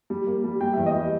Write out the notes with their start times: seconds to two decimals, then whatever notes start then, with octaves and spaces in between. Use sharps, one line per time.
0.10 G3
0.27 A#3
0.44 G3
0.61 G3 G5
0.73 E2 E5
0.86 D#5
0.95 G3